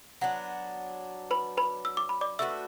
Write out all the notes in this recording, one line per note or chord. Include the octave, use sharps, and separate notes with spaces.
F#3 B3 D4 F#5
B4 B5
B4 B5
E6
D6
B5
D5 D6
A3 D4 F#4 B4 E5 E6
E6